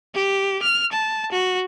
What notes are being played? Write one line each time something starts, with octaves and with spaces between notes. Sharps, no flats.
G4
F6
A5
F#4